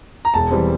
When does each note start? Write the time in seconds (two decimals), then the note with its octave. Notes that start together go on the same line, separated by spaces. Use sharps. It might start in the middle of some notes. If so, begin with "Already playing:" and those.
0.25 A#5
0.34 E1 A5
0.51 E3 G3 C4